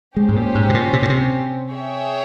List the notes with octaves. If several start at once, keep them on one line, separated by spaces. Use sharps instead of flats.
G#3 C#4 G4 C5
G#2
A#2
G#2
C3
A#2
C3
A#2
C3
G#4 C#5 E5 G5